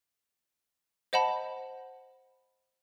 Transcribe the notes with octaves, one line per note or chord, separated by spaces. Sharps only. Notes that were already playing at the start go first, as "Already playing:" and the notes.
C5 D#5 F#5 A5 B5